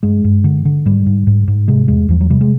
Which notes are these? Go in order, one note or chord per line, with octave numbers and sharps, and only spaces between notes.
G2 G#3
G2
D3
D3
G#2 G3
G#2
G#2
G#2
C3 G#3
E2 G#3
E2 F3
F#3
C3 G3
G#3